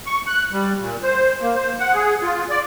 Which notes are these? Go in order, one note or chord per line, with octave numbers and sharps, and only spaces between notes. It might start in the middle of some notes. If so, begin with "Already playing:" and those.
C#6
F#6
G3
A#2
C5
A#3
C5
F#5
G#4
F4
D5